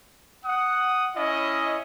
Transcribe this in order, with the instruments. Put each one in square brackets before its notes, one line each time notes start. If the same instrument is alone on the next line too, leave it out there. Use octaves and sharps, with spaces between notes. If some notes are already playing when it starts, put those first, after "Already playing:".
[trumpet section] F#5 D#6
C#4 E4 D#5